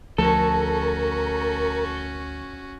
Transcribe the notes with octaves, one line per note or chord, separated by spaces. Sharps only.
D2 F3 A3 C#4 F#4 A4 A#4